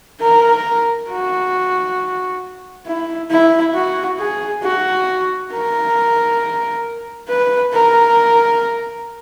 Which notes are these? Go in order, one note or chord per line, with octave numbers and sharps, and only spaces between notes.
A#4
F#4
E4
E4
F#4
G#4
F#4
A#4
B4
A#4